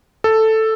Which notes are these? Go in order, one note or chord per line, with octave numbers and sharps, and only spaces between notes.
A4